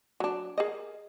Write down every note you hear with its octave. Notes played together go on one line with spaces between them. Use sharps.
F#3 D4
G#4 A#4 D#5